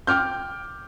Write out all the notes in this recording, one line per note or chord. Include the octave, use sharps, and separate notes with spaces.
G5 D6 F6 G6